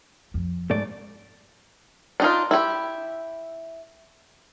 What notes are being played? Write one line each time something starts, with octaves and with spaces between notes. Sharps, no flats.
F2
G#2 A3 D5
D4 D#4 F4
E4 G4